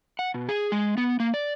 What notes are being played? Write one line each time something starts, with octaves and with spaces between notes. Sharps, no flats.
F#5
B2
G#4
G#3
B3
A#3
D5